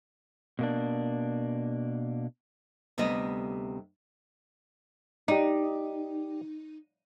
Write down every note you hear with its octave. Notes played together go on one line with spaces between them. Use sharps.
B2 A#3 D4
D2 C3 G3 B3 D#5
D#4 G4 D5